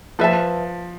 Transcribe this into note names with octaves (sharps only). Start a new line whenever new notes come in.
F3 B4 E5 A5